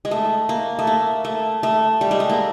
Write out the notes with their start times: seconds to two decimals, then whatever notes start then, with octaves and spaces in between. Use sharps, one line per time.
0.05 G#3
0.11 A3
0.49 A#3
0.79 A3
0.87 A#3
1.25 A3
1.63 A3
2.01 G3
2.11 G#3
2.20 A3
2.29 A#3